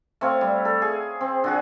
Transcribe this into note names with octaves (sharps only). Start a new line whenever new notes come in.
A3 C4 C#5 F5
G3
A4
G#4
C4
D3 F#4 G#4